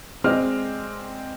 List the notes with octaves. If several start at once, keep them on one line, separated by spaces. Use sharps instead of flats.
G#3 C4 D5 D#5 F6